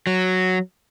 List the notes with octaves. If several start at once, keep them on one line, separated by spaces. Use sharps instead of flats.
F#3